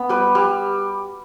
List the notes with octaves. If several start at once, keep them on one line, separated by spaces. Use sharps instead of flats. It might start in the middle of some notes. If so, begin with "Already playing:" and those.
Already playing: B3
G3 B4
G3